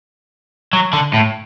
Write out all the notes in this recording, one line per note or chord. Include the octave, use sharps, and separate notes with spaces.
F#3
D3
A2